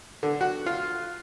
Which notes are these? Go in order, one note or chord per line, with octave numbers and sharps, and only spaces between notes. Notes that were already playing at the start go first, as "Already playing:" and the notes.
D3
F#4
F4